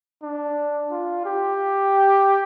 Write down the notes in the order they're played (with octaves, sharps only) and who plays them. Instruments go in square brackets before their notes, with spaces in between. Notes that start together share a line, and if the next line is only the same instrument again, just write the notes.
[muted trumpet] D4
F4
G4